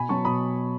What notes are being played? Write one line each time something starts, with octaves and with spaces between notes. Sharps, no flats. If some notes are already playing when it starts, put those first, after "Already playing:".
Already playing: B2 G#5 B5
F#3 B3 A5 C#6
B2 B5 D#6